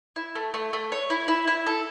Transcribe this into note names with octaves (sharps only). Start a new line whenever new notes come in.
E4
A3
A3
A3
C#5
E4
E4
E4
A4